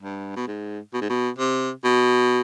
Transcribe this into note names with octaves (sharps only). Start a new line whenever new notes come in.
G2
B2
G#2
B2
G#2
B2
C3
B2